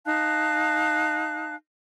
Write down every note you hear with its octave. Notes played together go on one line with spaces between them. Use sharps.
D#4 F5 A5 F#6